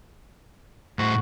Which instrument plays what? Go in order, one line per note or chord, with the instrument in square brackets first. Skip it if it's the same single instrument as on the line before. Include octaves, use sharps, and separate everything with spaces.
[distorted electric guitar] A2 C5 [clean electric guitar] F#4